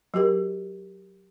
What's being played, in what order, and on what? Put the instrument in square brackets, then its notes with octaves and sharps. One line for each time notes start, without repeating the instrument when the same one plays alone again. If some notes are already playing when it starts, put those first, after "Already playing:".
[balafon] F#3 F#4 G4 A#4